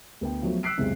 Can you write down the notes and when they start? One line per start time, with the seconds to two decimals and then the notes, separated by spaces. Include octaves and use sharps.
0.21 D2 B3 G5
0.42 F3 F#3 A3 B3
0.63 E6 F#6 B6 C7 D7
0.78 B1 E2 G#2 C3